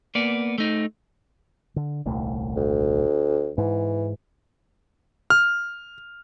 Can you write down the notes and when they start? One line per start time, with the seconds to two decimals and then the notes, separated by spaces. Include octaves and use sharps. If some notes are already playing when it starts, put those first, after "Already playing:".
0.15 A#3 B3 D5
0.58 A3 D#4
1.76 D3
2.06 D#1 C2 A3
2.56 D2
3.58 G#2 E3
5.30 F6